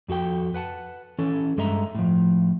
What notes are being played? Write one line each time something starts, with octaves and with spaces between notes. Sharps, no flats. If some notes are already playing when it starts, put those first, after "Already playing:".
F2 F#4 A4 G5
B4 F#5 G#5 A5
E3 C#4 A4
G2 G#3 A4 D#5 E5 A#5
A2 F3